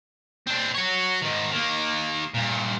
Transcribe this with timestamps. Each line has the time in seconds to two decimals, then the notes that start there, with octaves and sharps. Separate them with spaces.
0.47 C4 D4
0.74 F#4 C#5
1.22 G#2 D#3
1.52 D#3 A#3
2.34 G2 A#2